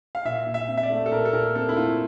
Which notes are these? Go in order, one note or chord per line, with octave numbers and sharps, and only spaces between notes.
F5
A#2 E5
A#2
E5
C4
E5
D5
A3
A4
A#2 A#4
A4
A#2 A#4
C4 A4
E4
A3 F4